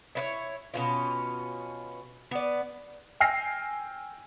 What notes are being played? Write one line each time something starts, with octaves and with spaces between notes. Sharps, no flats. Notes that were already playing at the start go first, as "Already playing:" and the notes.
E4 F4 C#5
B2 C#4 F4
B3 D5
G5 G#5 E6 F6 A#6 C7